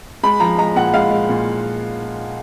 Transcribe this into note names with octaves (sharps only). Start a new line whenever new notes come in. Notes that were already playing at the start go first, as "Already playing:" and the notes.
G#3 B5
F3 A#5
G#3 A#5
A#2 F#5
G#3 F5
G#3
A#2